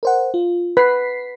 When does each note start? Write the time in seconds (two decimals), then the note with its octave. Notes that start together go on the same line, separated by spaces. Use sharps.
0.03 A#4 C5 F#5
0.34 F4
0.77 B4 B6 C7